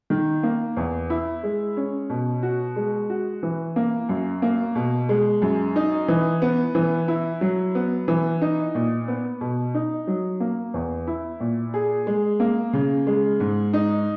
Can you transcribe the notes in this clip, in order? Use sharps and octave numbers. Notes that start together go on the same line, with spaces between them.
D#3
A#3
E2
E4
G#3
C#4
B2
F#4
G#3
F#4
E3
A#3
F#2
A#3
B2
G#3
F#2
D#4
E3
B3
E3
E4
F#3
B3
E3
D#4
A#2
B3
B2
D#4
F#3
A#3
E2
E4
A#2
G#4
G#3
A#3
C#3
G#3
G#2
D#4